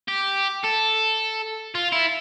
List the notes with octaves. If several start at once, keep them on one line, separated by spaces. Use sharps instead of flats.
G4
A4
F4
E4